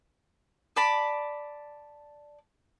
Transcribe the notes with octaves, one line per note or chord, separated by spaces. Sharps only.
D5 A5 B5